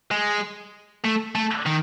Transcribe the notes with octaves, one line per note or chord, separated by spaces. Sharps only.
G#3
A3
A3
D#3